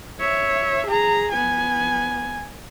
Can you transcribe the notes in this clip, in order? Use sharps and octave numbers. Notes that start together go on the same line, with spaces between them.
C#5 E5
G#4 A#5
B3 G#5